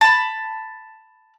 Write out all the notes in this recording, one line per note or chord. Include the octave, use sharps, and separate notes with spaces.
A5 B5